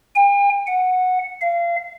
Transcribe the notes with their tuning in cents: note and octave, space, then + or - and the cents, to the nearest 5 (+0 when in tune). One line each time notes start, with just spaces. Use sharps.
G5 +45
F#5 -10
F5 -30